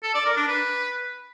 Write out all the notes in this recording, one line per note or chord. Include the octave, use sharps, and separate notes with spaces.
A4
D5
A#4
D4
B4